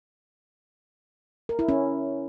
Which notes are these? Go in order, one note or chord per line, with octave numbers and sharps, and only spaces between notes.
A#4
E4
C#4